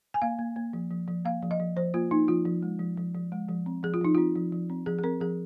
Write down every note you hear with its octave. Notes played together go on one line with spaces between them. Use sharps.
G#5
A#3 F5
A#3
A#3
F3
F3
F3
A#3 F5
F3
D#5
F3
F3 C5
A#3 F4
A#3 D#4
F3 F4
F3
G#3
F3
F3
F3
G#3
F3
C4
F3 G#4
F4
F3 D#4
C4 F4
F3
F3
C4
F3 G#4
G#4
C4 A#4
F3 G#4